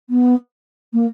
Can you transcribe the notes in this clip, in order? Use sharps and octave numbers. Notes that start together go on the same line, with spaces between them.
B3
A#3